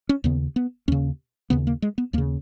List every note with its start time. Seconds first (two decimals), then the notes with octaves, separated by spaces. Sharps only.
0.09 C#4
0.24 D#2 C#3 B3
0.56 B3
0.88 D#2 C#3 C#4
1.50 D#2 C#3 B3
1.67 A#3
1.82 G#3
1.98 B3
2.13 D#2 A#3
2.18 C#3